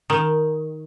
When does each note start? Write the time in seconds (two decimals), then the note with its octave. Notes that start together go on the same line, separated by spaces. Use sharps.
0.10 D#3